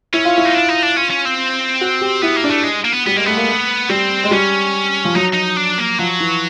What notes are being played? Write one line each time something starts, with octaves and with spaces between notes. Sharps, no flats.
C#4 E4
F4
E4
D#4
D4
D#4
D4
C#4 F4
C#4
C4
F#4
G4
B3 E4
A#3
D4
A3
G#3
A#3
B3
G3 B3
G#3 A#3
A3 B3
A#3
A3
G3 C4
G#3
G3 C#4
F3
F#3 D#4
D#4
D4
A#3
F3 F#3
E3